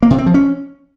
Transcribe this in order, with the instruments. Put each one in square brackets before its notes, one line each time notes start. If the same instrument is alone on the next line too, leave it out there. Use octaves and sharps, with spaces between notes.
[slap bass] A#3
C3
C4
F3
C#4